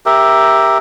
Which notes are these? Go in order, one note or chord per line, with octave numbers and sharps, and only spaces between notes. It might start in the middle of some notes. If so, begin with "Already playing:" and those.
G4 A#4 E5